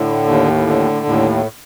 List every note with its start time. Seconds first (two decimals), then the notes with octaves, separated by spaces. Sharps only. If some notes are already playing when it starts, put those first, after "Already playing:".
Already playing: A2 D3
0.27 D#2
0.67 D3
1.06 D#2 A2